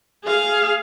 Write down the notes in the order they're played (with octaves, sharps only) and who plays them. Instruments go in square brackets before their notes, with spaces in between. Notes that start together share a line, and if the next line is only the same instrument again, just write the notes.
[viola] G#4 F5